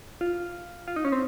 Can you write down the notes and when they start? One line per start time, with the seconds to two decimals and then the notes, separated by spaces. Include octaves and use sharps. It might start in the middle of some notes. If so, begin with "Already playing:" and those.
0.21 F4
0.88 F4
0.96 D#4
1.05 C#4
1.12 C4